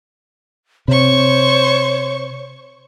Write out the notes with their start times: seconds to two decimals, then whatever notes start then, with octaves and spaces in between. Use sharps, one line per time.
0.88 C3 C5 C#5 C#6